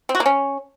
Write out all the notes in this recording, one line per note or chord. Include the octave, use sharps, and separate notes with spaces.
C4
F#4
A#3
C#4